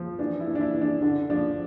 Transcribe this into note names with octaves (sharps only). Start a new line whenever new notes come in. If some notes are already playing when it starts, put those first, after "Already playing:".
Already playing: F3
E3 D4
E4
E3
D4
E4
E3
D4
D3 D4
F3 D4